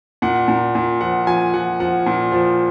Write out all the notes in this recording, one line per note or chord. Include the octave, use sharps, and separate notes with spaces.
A#2 F#5
A#2
A#2
F3 F#5
F3 G#5
F3 F#5
F3 F#5
A#2
F3